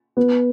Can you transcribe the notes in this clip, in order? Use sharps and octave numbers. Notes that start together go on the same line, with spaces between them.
B3